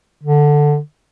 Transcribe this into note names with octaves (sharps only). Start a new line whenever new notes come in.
D3